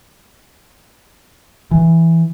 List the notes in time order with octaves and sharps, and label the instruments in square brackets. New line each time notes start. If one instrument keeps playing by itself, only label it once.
[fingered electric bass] E3